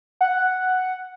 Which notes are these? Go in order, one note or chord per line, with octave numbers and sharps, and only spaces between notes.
F#5